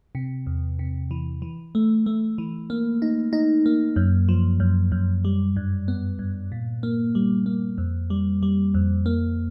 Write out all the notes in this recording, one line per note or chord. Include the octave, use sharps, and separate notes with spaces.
C3
E2
C3
E3
E3
A3
A3
E3
A#3
D#4
D#4
A#3
F#2
F3
F#2
F#2
G3
G2
B3
G2
A#2
A#3
G3
A#3
F2
G3
G3
F2
A#3